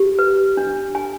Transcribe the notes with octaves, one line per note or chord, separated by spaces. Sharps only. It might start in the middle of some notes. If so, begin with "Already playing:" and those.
Already playing: G4
B4
D4
G#5